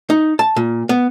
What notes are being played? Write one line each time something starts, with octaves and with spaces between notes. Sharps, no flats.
D#4
A5
A#2
B3